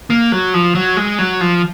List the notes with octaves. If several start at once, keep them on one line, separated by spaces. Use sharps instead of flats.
A#3
F#3
F3
F#3
G#3
F#3
F3